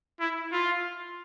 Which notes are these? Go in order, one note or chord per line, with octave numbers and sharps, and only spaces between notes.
E4
F4